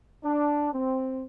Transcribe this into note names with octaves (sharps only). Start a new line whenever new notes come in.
D4
C4